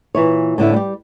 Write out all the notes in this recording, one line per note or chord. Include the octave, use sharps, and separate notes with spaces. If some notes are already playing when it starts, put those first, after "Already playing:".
A#2 E3 E4 C#5
A2 D3 A3 E4
G3 G4